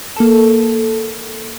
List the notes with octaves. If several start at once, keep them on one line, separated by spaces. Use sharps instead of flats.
A#3 A4